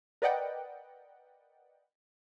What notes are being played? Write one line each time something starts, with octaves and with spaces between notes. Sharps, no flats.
A#4 B4 D5 D#5 F#5 G5